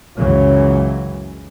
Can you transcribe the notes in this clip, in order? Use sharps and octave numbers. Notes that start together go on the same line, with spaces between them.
C#2 F#2 C#3 E3 F#3